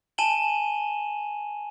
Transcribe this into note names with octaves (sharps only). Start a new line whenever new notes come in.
G#5 A5 D#7 E7 F#7 G7